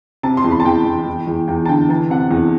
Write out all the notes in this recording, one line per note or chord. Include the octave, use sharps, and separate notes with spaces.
C3 A5
C6
E2
B5
A5
E2 G5
E2
E2
E2
E2 G5
A5
D3 G5
E3 A5
C3 F#5
E2